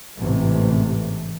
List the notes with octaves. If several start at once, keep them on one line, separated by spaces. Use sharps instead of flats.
A1 G#2 C3 E3 A3